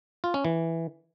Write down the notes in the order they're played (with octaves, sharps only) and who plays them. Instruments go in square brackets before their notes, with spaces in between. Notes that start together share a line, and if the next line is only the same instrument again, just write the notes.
[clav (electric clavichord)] F4
C#4
E3